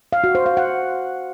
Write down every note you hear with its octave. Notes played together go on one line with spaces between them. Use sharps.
F5
F#4
C5
F5
F#5